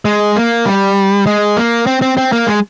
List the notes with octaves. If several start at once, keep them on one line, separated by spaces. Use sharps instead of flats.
G#3
A#3
G3
G#3
A#3
C4
C4
C4
A#3
G#3